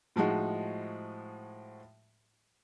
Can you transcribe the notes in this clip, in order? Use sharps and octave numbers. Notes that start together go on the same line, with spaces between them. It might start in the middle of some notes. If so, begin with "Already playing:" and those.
A2 F3 G#3 D#4 F#4